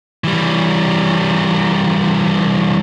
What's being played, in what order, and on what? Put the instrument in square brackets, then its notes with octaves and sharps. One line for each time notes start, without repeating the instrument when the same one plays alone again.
[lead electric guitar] E3 G3